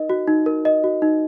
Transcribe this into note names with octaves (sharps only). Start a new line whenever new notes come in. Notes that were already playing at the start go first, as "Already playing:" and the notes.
Already playing: D#4 A#4 D#5
F#4
D#4
A#4
D#5
F#4
D#4